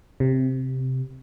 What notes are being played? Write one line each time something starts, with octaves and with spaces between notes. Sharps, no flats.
C3